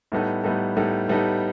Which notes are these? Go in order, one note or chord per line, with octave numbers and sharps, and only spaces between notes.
A2 G3 B3 D#4 A4
A2 G3 B3 D#4 A4
A2 G3 B3 D#4 A4
A2 G3 B3 D#4 A4